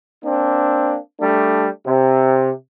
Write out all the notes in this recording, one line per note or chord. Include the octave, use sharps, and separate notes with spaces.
A#3 C4 D4
G3 A3 D4
C3